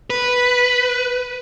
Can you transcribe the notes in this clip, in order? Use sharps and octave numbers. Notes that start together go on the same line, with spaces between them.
B4